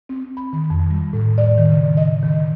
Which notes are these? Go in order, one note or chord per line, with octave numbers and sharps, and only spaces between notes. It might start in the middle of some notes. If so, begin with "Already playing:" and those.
C4
B5
D#3
F2
G3
A2
D5
D#3
C#3
D#5
D#3